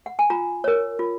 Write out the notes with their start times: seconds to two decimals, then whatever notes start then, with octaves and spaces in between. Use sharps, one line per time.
0.06 F#5
0.19 G#5
0.30 F4 A#5
0.64 A#4 C#5
0.99 F4